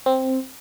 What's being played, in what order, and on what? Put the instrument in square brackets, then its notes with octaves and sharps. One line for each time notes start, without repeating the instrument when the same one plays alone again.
[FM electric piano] C4